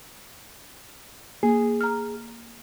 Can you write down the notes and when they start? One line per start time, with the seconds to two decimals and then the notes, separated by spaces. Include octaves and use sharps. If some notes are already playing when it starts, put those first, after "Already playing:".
1.43 A#3 G#4
1.81 A#5 F6